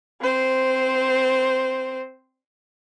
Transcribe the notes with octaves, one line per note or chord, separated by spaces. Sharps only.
C4 C5